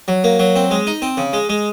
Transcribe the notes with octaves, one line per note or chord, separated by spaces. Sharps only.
F#3
A#3
F#3
C4
G#3
D#4
C4
C#3
G#3
G#3